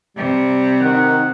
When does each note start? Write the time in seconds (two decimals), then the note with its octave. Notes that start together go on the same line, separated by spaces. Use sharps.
0.17 C3 G3
0.81 D#3 F#5